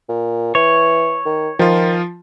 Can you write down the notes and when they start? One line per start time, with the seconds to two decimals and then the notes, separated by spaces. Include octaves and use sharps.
0.09 A#2
0.55 E3 C#5
1.26 D#3
1.59 D#3 F3 F4